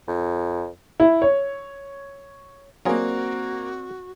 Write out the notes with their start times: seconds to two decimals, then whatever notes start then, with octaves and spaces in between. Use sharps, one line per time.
0.08 F2
1.00 E4
1.22 C#5
2.85 F#3 A#3 C4 F4 F#4 G#4 A#4 D5